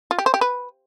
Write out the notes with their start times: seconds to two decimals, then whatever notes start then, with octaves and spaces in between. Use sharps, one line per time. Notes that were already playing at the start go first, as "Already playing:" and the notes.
0.11 F4
0.18 G4
0.26 C5
0.34 G4
0.41 B4